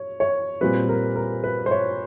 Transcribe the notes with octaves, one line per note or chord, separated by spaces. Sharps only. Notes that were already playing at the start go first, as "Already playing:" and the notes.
Already playing: C#5
C#5
A#2 G3 C4 B4
A#4
A#4
B4
C5
C#5